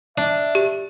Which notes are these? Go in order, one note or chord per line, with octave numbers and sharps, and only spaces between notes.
D4 E5
G4